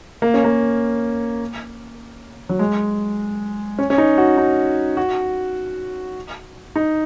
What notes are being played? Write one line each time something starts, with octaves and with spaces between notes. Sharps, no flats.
A#3
C#4
A#3
F#3
G#3
C#4
C#4
D#4
F#4
D#4
F#4
D#4